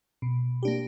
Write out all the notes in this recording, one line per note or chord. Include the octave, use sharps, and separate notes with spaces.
B2
A#3 D4 G4